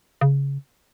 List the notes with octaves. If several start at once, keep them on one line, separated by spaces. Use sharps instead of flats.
C#3